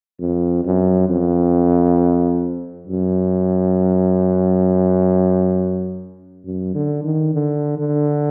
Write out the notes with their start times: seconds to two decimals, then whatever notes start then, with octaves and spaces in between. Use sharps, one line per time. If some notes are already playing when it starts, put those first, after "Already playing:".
0.20 F2
0.65 F#2
1.09 F2
2.87 F#2
6.45 F#2
6.75 D3
7.04 D#3
7.34 D3
7.78 D3